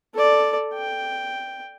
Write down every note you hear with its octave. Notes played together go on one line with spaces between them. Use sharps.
A4 D5
G5